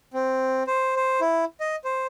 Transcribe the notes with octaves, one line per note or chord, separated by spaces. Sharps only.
C4
C5
C5
E4
D#5
C5